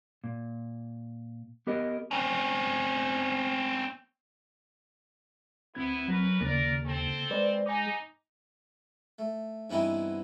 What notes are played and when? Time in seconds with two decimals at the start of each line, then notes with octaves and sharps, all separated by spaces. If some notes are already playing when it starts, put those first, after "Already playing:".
0.24 A#2
1.67 B3 G4 A#4 D#5
2.11 C4 C#4
5.75 D2 B3 C4 E4 G#6
6.08 F#3 C#4 A#4 B4
6.41 D#2 C#3 A#3 A#4 D5
6.84 C4 A4
7.31 G#3 B4 C5 D5
7.66 D#4 G#5 D6
9.19 A3
9.70 G2 E3 B3 C4 D#4 E4